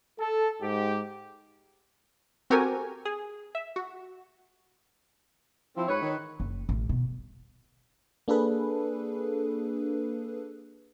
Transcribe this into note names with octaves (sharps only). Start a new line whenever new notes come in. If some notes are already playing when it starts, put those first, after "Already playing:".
A4
G#2 G4
C4 F#4 G4 A4 A#4 G#5
G#4
E5
F#4
F3 C4 E4
G#2 B4 C#5
D#3
F#1
A1
B2
A#3 D4 G#4 A4 B4